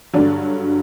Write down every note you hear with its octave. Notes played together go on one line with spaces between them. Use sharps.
G2 D3 F#3 D4